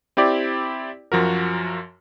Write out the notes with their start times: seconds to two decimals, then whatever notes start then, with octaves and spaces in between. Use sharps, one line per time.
0.17 C4 E4 G4 D5
1.12 F#2 F3 F#4 A#4